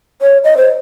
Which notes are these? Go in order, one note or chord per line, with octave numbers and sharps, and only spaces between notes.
C#5
D#5
C5